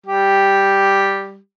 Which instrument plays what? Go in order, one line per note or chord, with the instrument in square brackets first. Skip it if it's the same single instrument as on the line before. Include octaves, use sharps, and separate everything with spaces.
[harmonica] G3 G4